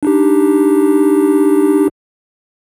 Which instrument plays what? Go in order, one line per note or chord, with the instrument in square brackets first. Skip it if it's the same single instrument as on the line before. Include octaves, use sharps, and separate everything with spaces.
[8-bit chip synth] D4 D#4 G4